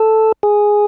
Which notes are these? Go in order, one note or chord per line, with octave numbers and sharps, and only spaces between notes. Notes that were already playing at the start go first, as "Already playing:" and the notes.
Already playing: A4
G#4